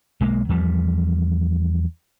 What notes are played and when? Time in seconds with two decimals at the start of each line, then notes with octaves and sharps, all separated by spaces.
0.21 B1 G#3 A#3
0.49 E2 F3 G3